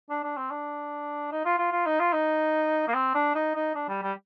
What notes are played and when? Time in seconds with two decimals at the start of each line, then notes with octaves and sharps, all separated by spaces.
0.10 D4
0.23 D4
0.37 C4
0.51 D4
1.32 D#4
1.45 F4
1.58 F4
1.72 F4
1.86 D#4
1.99 F4
2.13 D#4
2.88 A#3
2.94 C4
3.15 D4
3.35 D#4
3.56 D#4
3.75 D4
3.89 G3
4.03 G3